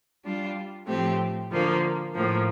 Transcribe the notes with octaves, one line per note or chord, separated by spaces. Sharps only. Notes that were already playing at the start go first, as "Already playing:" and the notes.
G3 D4 F4
A2 F3 A3 C4 G4
D3 F3 A#3 F4
A2 F3 A#3